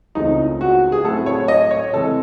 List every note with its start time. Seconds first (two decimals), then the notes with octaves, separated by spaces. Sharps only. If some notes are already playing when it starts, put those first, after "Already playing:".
0.15 C#2 C#3 E3 A3 C4 D#4
0.61 F#4
0.92 G#4
1.04 A2 F#3 A3 C4 E4 A4
1.26 C#5
1.48 D#5
1.71 C#5
1.93 C3 E3 G#3 C4 A4